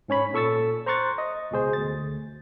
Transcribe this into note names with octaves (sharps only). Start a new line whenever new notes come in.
G#2 C#4 C#5 B5
A#2 A4 C#6 E6 A6
C5 A#5 C6 C#6 F#6 A6
D#5
C#2 B2 G#4 C5
D2 A6